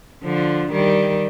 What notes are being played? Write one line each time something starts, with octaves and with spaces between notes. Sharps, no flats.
D3 F3
D#3 G3